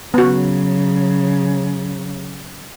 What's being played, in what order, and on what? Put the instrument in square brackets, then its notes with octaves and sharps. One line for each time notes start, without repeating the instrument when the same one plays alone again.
[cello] C#3 F#3 [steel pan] B3 F#4